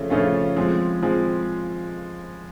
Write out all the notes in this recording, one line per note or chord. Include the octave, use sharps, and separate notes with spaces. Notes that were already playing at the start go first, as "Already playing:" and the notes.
Already playing: C#3 F3 A3 C#4 F4
C#3 F3 A3 C#4 F4
F3 G#3 C4
F3 G#3 C4